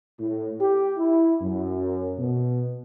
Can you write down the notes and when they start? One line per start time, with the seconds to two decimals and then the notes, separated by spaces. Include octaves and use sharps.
0.20 A2
0.61 G4
0.98 E4
1.42 F#2
2.19 B2